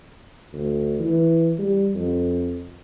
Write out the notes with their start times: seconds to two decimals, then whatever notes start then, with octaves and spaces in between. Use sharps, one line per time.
0.53 D2
1.00 E3
1.59 G3
1.95 F2